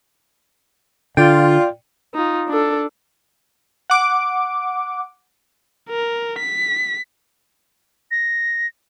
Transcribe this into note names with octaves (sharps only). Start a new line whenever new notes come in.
D3 F4 D5 G5
D#4 F4
D4 A4
F#5 D6
A#4
B6
A#6